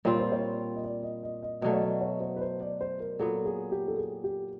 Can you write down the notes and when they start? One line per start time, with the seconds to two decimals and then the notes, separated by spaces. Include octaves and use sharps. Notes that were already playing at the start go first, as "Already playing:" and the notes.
0.05 A#2 G3 C4 F4 C#5
0.19 C5
0.32 C#5
0.75 D#5
0.84 D5
1.03 D#5
1.23 D#5
1.42 D#5
1.62 B2 F#3 A3 D5
1.73 C#5
1.82 D5
2.01 C#5
2.21 C5
2.36 B4
2.41 C5
2.61 D5
2.81 C5
3.00 A#4
3.19 A#2 F#3 B3 A4
3.45 G#4
3.72 G4
3.88 A4
3.98 G#4
4.24 G4